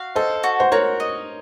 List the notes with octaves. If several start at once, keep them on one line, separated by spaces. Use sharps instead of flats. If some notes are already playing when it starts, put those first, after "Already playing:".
Already playing: F#4 F5
A4 C5 D#5
F#4
C5
F#4 A#4 C#5
D#5